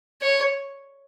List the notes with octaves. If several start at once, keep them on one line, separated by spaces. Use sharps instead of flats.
C#5